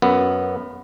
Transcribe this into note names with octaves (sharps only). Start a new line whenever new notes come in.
F#2 B3